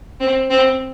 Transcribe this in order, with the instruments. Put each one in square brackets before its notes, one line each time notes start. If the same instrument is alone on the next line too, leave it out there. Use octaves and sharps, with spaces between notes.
[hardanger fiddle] C4
C4